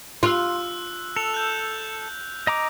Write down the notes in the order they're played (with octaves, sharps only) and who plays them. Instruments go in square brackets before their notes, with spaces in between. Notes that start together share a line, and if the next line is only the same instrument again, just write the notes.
[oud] F4 [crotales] E6 F#6
[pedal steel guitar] A4 [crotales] F7
[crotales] F#6 G6
[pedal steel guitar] D#5 A#5 D6